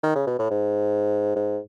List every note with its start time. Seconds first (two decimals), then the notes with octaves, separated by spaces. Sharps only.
0.03 D#3
0.16 C#3
0.27 B2
0.38 A2
0.51 G#2
1.36 G#2